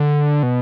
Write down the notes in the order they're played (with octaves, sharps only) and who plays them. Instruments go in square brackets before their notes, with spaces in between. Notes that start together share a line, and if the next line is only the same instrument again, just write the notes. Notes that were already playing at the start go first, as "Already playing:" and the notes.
Already playing: [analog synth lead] D3
B2